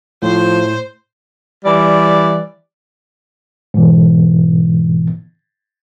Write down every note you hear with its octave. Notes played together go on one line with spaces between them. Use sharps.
A2 F3 C5
E3 G3 D5
G#2 B2 E3